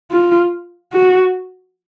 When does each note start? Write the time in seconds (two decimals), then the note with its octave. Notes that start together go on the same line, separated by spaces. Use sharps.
0.11 F4
0.93 F#4